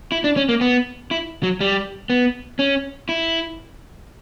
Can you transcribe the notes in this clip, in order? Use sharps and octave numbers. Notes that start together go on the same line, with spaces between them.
E4
D4
C#4
A#3
B3
E4
F#3
G3
B3
C#4
E4